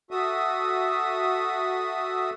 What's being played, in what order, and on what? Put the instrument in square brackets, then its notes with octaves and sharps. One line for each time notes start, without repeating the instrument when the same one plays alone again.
[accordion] F#4 A4 E5 D#6